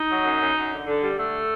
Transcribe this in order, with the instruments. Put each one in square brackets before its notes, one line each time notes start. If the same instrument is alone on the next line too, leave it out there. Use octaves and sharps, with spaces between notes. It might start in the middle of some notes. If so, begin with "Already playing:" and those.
Already playing: [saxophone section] D#4
F#3
F#2
F#2
F#2
D3
D3
G3
D3 A3